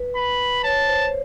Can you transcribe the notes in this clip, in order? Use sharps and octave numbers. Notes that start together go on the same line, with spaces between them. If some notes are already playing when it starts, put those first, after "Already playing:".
Already playing: B4
B5
C#5 A5
C5